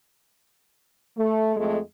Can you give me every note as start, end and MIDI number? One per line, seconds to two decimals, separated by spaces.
1.17 1.54 57
1.57 1.78 41
1.57 1.78 56
1.57 1.78 57